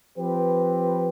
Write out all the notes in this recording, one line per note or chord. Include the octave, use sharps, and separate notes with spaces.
F3 C4 G4 B4